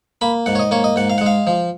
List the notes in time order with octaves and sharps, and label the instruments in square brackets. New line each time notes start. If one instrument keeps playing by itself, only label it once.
[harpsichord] A#3 B5
G#2 F#5
C#5
D#5
A#3 C#5
D#5
G#2 F#5
F5
G#3 F#5
F5
F3